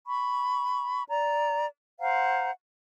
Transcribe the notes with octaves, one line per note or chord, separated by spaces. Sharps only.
B5 C#6
D5 A#5
C5 F5 F#5 A#5